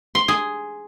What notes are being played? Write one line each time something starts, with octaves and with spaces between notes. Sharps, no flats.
C6
G#4